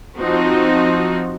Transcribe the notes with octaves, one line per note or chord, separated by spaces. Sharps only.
F3 C4 D#4 F#4